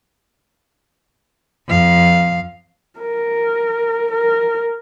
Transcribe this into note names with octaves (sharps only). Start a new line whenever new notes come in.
F2 F5
A#4
A#4